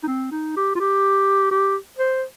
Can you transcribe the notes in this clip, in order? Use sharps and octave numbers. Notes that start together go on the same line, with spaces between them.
D#4
C4
D#4
G4
F4
G4
G4
C5